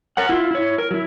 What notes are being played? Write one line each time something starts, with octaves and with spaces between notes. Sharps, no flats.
A#4 C#5 F#5
E4 F4
E4 C#5
A#4
F#3 E4